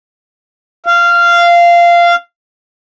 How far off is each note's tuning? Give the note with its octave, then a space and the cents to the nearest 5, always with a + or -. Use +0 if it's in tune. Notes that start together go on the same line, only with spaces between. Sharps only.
F5 -15